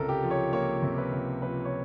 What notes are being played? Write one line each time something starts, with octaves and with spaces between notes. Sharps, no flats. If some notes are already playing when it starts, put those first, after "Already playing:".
Already playing: C#2 C3 A4 A#4
G4
F3
C#5
A#3 C#5
C3
B4
C#2
F3 B4
C#5